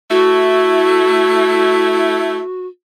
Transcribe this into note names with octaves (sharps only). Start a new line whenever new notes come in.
A3 E4 F#4